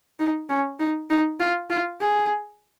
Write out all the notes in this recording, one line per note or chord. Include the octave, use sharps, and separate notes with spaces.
D#4
C#4
D#4
D#4
F4
F4
G#4